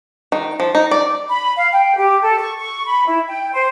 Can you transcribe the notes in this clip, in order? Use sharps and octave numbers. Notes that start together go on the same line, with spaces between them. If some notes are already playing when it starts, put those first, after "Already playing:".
D#3
F3
D#4
D5
B5
F5
G5
G4
A4
C#6
C#6
B5
E4
G5
C5